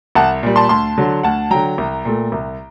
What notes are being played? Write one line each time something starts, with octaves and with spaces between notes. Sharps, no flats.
C2 F#5 A5
A#2 G3
A5 C6
D2 A5 C6
D3 F#3
D2 F#5 A5
D3 F#3 G5 A#5
C2
A#2 A3
C2